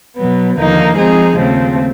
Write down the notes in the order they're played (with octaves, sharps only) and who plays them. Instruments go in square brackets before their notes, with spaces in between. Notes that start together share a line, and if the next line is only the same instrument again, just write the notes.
[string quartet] B2 F#3 B3
D#2 D3 F3 A#3 D#4
F3 G#3 C4 D#4 G#4
D#2 C#3 F3 A3 C4